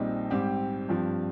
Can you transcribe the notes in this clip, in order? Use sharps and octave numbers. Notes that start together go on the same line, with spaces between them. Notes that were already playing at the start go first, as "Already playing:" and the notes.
Already playing: A#1 A#2 G3 C4 D#4
G#2 G3 C4 G4
G2 F3 C4